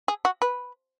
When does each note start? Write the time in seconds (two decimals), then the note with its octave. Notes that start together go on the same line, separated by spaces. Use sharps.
0.08 G#4
0.25 F#4
0.42 B4